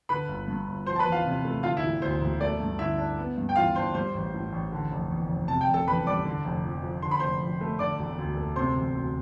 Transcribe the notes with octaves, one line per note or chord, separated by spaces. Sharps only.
D3 B4 B5
G1
G2
G1
F3 C5 C6
A5
B4 B5
E2
F4 F5
C3
A3
D3 F4 F5
E4 E5
E1
D2 C5
E1
A3 D5
G2
D3 E4 E5
D4
B3
G2
G5
E3 F4 F5
D4 C5 C6
G3 C5 C6
A1
A2
A1
D3
F1
E2
F1
C3 A5
G5
F1
A4 A5
E2 B4 B5
G3 D5 D6
D3
F1
F2
F3
D3 C6
B5
F1 C5 C6
F2
A3
D3 D5 D6
E1
D2
A3
C3 C5 C6
E1
D2